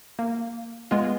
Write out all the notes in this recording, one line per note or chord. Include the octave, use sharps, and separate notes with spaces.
A#3
G#3 B3 F4